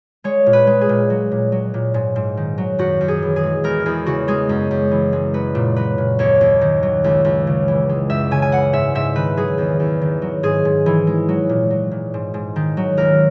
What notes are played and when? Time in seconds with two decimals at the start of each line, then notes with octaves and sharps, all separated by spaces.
0.24 G#3 C#5
0.46 A#2
0.53 B4
0.67 G#3
0.81 G#4
0.89 A#2
1.10 F#3
1.31 A#2
1.52 F#3
1.74 A#2
1.94 G#2
2.16 G#2
2.37 D#3
2.58 F#3
2.79 F#2 F#4
3.01 F#2
3.08 G#4
3.22 E3
3.36 G#4
3.43 G#3
3.64 E2 A#4
3.86 E2 G#4
4.06 C#3 F#4
4.28 G#3 G#4
4.49 F#2
4.71 F#2
4.91 E3
5.13 G#3
5.34 F#3 B4
5.55 A#2
5.76 F#3 B4
5.98 A#2
6.19 D#2 C#5
6.41 D#2
6.61 D#3
6.83 F#3
7.04 C#2
7.25 C#2
7.47 C#3
7.68 E3
7.89 G#3
8.10 F#2 E5
8.31 C#3 G#5
8.42 G#5
8.52 E3 F#5
8.73 G#2 E5
8.95 G#2 E5
9.15 D#3 B4
9.37 F#3 G#4
9.58 E2
9.80 E2
10.01 D#3
10.22 F#3
10.43 G#2 G#4
10.65 G#2
10.86 E3
11.07 G#3
11.29 F#3
11.49 A#2
11.71 F#3
11.91 A#2
12.14 G#2
12.34 G#2
12.56 D#3
12.77 F#3
12.97 C#2 A#4